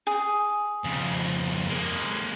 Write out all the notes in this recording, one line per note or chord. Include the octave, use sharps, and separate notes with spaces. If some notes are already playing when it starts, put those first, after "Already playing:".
G#4
F2 C#3
G#3 A#3